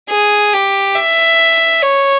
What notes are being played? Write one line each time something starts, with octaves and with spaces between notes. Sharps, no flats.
G#4
G4
E5
C#5